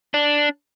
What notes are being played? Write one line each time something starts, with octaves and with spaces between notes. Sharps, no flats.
D4